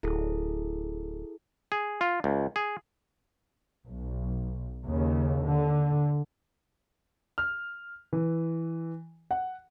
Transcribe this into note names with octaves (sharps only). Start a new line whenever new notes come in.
D1 E4 G#4 A4
G#4
F4
C#2
G#4
B1
D#2 C#3
D3
F6
E3
F#5